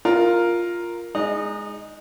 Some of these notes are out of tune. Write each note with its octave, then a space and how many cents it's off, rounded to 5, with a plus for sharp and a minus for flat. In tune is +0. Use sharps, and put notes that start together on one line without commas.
F4 +0 A#4 +0
G#3 +0 D#4 +0 D#5 -35